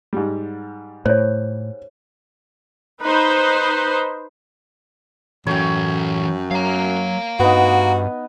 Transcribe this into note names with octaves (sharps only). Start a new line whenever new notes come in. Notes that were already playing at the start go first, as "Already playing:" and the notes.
G#2 G3
A2 C5 C#5
D#4 B4 C5
F#2 E3 A4 C#5 G5
F#3 F5 A#5
G2 B3 D#4 F#4